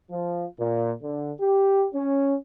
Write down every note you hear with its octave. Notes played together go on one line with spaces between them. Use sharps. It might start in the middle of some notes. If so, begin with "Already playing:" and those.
F3
A#2
D3
G4
C#4